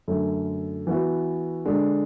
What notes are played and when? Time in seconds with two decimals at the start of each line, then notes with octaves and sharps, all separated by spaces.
0.08 F#2 D3 A3
0.87 E3 B3 F#4
1.66 D3 G#3 D4